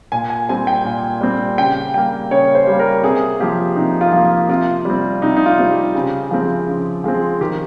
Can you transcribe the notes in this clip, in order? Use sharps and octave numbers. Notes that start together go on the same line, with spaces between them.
A#2 G#5
G#5
G3 C4 G#5
G5
A#2
G3 C4
C#3 G5
G3 A#3 G5
C#3 C#5
C5
G3 A#3
A#4
C3 G#4
F3 A#3 G4
C3 D#4
F4
F3 A#3
F4
C3 F4
G3 C4
C3 D#4
D#4
F4
G3 C4
G4
C#3
F3 G#3 C4
C#3
F3 G#3 C4
D#3 G4